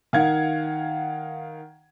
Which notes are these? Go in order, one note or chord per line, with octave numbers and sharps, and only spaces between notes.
D#3 F5 F#5 G#6